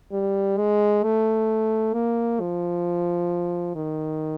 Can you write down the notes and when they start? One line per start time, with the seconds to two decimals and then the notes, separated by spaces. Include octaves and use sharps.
0.12 G3
0.58 G#3
1.03 A3
1.93 A#3
2.40 F3
3.75 D#3